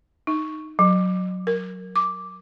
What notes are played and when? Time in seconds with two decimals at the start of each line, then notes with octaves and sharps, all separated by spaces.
0.27 D#4
0.79 F#3
1.47 A#4
1.95 D6